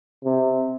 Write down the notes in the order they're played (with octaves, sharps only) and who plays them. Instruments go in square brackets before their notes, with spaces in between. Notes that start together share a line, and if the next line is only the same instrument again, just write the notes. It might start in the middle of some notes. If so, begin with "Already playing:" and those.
[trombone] C3